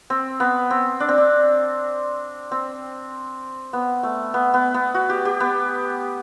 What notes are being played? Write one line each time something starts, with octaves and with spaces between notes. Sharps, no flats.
C4
B3
C4
D4
C4
D4
C4
B3
A3
B3
B3
B3
F#4
G4
G4
B3